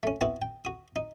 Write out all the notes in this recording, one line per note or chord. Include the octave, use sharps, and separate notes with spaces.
A3 C#4
B3 C4 E4 F#4 B4
G5
F#4 D#6
D#4